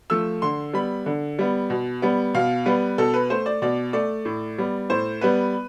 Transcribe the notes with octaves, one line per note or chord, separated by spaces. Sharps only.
F3 A3 E6
D3 C6
G3 B3 B5
D3
G3 B3
B2
G3 B3
B2 F5
G3 B3 B4
B2 A4
B4
A3 C5
D5
B2 D5
A3 D5
A2
G3 B3
A2 C5
G3 B3 B4